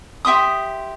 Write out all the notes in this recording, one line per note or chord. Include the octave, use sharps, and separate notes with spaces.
G4 E5 C6 D#6